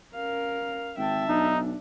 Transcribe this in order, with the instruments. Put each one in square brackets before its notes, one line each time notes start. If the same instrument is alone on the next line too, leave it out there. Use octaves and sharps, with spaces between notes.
[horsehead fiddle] C#4 A#4 [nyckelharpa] F5
[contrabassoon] G#1 [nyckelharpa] E5 [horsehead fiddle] G5 A5
[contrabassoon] B1 [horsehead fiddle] D4 [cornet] D#4